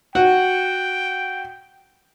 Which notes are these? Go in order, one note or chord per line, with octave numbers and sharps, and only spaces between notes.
F#4 G5